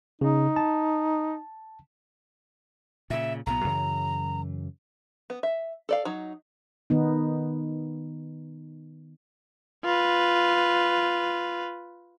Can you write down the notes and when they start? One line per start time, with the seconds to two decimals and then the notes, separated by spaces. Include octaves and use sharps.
0.21 C#3 D#4
0.56 A5
3.10 A#2 C#3 E5
3.46 B1 A2 B3 A#5
3.64 F#2 C#3 E3
5.30 B3
5.43 E5
5.89 A4 D5 F5
6.05 F#3 D#4
6.90 D#3 B3 D#4
9.85 F4 B4